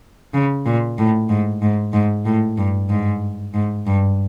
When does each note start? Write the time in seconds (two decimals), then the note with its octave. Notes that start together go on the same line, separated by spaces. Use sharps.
0.34 C#3
0.66 A#2
0.98 A2
1.29 G#2
1.62 G#2
1.93 G#2
2.25 A2
2.57 G2
2.90 G#2
3.54 G#2
3.86 G2